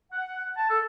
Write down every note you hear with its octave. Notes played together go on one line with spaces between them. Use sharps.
F#5
A5
A4